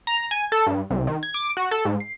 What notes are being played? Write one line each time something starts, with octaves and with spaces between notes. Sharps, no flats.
A#5
G#5
A4
G2
C2
D#3
G#6
D6
F#4
A4
G#2
C7